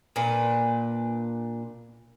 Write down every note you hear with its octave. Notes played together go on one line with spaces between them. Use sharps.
A#2 D4 B4